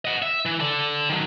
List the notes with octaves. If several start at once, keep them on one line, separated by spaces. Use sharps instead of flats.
D#5 F#5
E5
E3
A4 D5
D#3 F#3